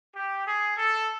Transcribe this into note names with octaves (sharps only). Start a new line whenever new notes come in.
G4
G#4
A4